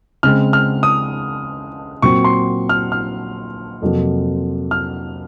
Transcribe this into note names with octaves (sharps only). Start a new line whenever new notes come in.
C#3 G#3 C4 F6
F6
D#6
A#2 F#3 C4 C#6
C6
F6
F6
F2 C3 F#3 A#3
F6